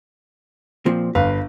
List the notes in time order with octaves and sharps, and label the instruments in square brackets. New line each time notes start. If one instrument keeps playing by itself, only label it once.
[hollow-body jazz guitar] A#2 F3 C4
[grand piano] G1 F5 [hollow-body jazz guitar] B4